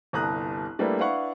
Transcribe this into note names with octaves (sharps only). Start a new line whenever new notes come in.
G1 C2 A#5 D#6 F#6
G3 A3 A#3 D4 E4 B4
D4 E4 B4 F5 F#5 C#6